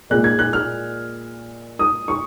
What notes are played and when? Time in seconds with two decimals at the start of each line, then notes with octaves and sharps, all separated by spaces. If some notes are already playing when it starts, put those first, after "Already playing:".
0.10 A#2 G#3 F#6
0.24 G#6
0.39 F#6
0.53 F6
1.79 D#6
2.08 C#6